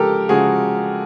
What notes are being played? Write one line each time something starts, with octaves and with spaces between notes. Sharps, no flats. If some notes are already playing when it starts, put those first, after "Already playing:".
Already playing: C#3 F3 G#3 G4 A4 A#4
C#3 F3 G#3 F#4 G#4